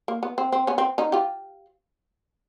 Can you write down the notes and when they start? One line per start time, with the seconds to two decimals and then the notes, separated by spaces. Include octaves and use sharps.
0.08 A#3
0.23 B3
0.38 C4
0.52 C4
0.67 B3 C#4
0.78 C4
0.98 C#4 D#4
1.12 F4 G4